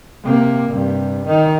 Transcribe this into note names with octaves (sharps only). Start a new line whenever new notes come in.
C3 A#3
G2 C3
D#3 D#4